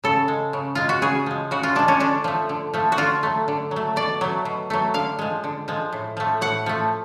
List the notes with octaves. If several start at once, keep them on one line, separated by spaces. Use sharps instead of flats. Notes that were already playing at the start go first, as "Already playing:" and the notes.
C#3 A4
G#3
C#3
G#3 F4
F#4
C#3 G#4
F3 G#3
C#3 F#4
F4
F3 G#3 D4
C#4
D3 D4
F3 A3
D3
F3 A3
F#4
D3 F4
F#3 A3
D3
F#3
A3
B2 D5
F#3 A3
B2
F#3 A3
D3 F5
F3 G#3
D3
F3 G#3
A2
F3 A3
A2 F#5
F3 A3